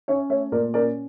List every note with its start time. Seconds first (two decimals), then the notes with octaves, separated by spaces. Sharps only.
0.08 C#4 C#5 E5
0.30 A3 C#5 E5
0.52 A#2 A#4 D5
0.74 C#4 A#4 D5